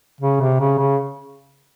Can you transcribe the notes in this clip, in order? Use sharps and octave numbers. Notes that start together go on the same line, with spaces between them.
C#3
C3
C#3
C#3